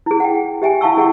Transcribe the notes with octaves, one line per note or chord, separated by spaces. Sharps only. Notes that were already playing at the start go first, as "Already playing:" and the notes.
E4 G#4
F#5 G5
G4 E5 G5 G#5
E4 F5 F#5 A5 C#6 E6
E4 G#4 F#5 G5 C#6